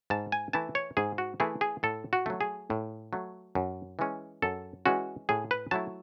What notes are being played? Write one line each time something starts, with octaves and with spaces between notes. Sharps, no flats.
G#2 A5
G#5
E3 A3 E4 A5
C#5
G#2 G#4
F#4
E3 A3 E4 G#4
G#4
A2 A4
F#4
F#3 A3
G#4
A2
F#3 A3
F#2
E3 G#3 C#4
F#2 A4
E3 G#3 C#4 F#4
A2 G#4
B4
F#3 A3 E4 A5